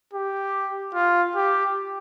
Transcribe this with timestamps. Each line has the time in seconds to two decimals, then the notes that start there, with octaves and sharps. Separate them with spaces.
0.13 G4
0.95 F4
1.36 G4